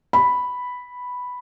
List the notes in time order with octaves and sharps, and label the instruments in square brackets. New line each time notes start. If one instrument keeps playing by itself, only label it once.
[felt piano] B5